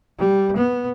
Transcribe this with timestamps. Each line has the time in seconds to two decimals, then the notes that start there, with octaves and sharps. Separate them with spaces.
0.18 G3
0.57 B3